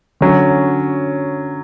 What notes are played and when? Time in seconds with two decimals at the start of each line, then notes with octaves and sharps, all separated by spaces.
0.21 D3 F#3 C#4